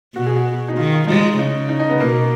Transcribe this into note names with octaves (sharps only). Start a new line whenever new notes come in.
B2 F#4
G#4
F#4
D#4
D#3 F4
F4
G#3 D#4
C#3 D#4
D#4
D#4
B3
B2 A#3